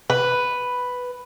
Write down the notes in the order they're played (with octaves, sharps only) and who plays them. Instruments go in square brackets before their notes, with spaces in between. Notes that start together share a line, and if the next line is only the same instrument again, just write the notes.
[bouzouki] B4